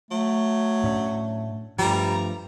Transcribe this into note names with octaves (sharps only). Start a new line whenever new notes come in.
F#3 A3
A2 C#4 D4
G2 F3 G3 A3 A#5